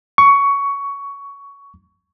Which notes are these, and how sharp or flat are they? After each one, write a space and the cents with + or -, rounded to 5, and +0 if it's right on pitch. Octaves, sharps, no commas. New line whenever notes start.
C#6 +15